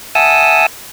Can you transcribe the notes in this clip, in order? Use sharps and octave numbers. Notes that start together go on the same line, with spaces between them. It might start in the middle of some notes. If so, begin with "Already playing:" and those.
E5 F#5 G#5 A5 D#6 E6